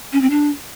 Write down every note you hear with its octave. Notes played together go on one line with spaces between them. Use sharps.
C#4
C4
D4